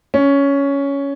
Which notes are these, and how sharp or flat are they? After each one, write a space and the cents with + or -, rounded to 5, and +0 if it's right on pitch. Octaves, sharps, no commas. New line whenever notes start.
C#4 +10